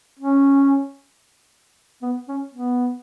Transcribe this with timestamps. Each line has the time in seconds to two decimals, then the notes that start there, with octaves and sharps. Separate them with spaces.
0.19 C#4
2.02 B3
2.28 C#4
2.54 B3